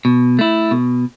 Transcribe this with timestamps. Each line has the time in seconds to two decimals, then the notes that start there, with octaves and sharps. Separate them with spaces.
0.05 B2
0.39 A3 E4
0.71 B2